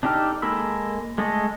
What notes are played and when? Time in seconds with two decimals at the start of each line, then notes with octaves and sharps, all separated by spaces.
0.03 D4 D#4 G4 A4 F6
0.42 G#3 A#3 A4 B5 E6
1.18 G#3 A3 A4 D#5